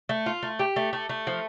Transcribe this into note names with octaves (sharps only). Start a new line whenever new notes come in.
A3
F4
A3
G4
A3
A3
A3
F3